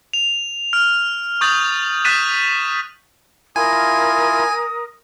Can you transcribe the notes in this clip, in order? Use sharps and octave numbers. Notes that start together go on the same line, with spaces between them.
F7
F6
C#6 D#6 F6 G6 A6 F#7
D#6 F#6 A6 B6 D#7 E7
E4 F4 A#4 G#5 D#6